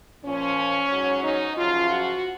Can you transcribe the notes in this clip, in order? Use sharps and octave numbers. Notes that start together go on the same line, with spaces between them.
A#2 F3 C#4
G#2 F#3
D#4
F#2 C#3 F3 F4
F#4